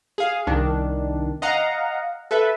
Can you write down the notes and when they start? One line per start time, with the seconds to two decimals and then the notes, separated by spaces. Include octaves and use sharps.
0.18 G#4 F5
0.47 C2 D#3 D4
1.42 D#5 F5 F#5 A#5
2.31 A4 B4 E5